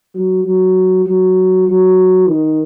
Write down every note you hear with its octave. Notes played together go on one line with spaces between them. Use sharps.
F#3
F#3
F#3
F#3
D#3